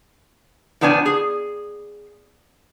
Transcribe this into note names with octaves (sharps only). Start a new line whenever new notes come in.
A2 F3 B3 D4 F4 G#5
G#4